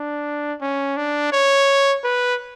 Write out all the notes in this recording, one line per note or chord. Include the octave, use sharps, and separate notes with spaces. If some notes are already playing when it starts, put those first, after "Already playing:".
Already playing: D4
C#4
D4
C#5
B4